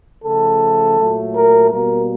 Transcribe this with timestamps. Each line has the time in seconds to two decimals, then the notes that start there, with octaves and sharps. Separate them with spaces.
0.23 C#3 F3 A3 A4
0.97 A#2 F#3 A3
1.33 A#4
1.70 B2 G3 A#3 A#4